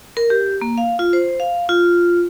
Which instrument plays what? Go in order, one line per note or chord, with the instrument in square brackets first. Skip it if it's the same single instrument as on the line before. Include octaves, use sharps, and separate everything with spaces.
[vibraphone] A#4
G4
A#3
F5
F4
C5
F5
F4